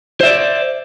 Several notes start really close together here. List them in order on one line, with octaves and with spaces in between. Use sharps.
C5 E5 D5